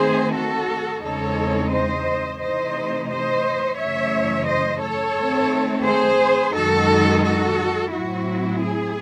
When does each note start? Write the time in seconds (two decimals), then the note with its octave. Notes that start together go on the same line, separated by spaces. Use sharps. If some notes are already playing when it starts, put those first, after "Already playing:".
Already playing: D#3 A3 C4 G#4 C5
0.34 F#4 A4
1.03 E2 C#3 G#3 C4 D#4 A4 C#5
1.71 C5 D#5
2.40 C3 E3 A3 D#4 C5 D#5
3.10 C5 D#5
3.78 F#2 C#3 E3 A3 C#5 E5
4.47 C5 D#5
4.81 A4 C#5
5.16 D#3 A3 C4
5.85 G#4 C5
6.54 F#2 D#3 G#3 D#4 F#4 A4
7.23 F#4 A4
7.91 A2 F#3 C4 E4 F#4
8.62 G#4